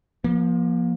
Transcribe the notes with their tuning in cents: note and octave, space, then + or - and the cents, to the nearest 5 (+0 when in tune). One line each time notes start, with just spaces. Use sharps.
F3 +0 A#3 +35